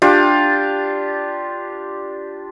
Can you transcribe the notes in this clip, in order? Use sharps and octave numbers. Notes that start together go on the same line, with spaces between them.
D4 F4 G4